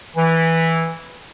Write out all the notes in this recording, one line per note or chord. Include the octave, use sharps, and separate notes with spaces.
E3